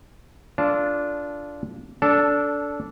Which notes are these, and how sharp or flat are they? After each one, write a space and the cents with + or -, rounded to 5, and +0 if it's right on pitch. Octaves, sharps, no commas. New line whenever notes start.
D4 -15 F4 -15 A4 +0
D4 -20 A4 +0